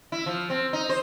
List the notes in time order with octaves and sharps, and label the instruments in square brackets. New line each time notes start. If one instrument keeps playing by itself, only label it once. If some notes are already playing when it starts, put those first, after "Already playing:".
[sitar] E4
F3
C4
D#4
C5